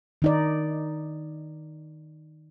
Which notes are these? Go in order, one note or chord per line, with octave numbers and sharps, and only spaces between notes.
D#3 D#4 D5